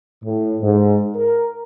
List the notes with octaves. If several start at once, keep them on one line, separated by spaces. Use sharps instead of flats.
A2
G#2
A#4